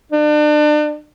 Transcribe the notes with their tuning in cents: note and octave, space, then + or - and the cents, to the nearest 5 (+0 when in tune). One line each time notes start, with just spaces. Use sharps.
D4 +35